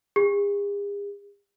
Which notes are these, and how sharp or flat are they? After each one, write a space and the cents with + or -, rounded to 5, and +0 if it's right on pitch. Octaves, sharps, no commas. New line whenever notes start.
G#4 -45